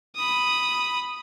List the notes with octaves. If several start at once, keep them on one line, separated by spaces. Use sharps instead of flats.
B5 D#6